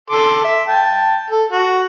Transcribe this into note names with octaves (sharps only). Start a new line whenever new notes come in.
A4 C6 D6
E5
G5 A5
A4
F#4